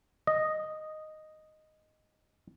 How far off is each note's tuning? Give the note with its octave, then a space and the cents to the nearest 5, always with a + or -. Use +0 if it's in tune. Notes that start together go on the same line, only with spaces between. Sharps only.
D#5 -5